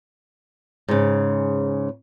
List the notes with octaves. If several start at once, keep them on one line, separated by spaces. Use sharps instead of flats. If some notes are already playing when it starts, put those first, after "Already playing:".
G#2 C#3